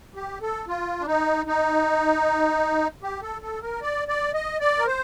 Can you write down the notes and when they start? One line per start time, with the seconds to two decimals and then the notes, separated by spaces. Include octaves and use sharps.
0.15 G4
0.41 A4
0.67 F4
1.01 D4
1.07 D#4
1.46 D#4
3.03 G4
3.22 A4
3.42 A4
3.62 A#4
3.82 D5
4.08 D5
4.34 D#5
4.60 D5
4.79 A#4
4.87 C5